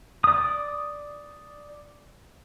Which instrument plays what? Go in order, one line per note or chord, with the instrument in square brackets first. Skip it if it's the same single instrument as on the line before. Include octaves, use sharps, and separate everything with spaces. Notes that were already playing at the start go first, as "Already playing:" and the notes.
[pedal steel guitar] D5 D#6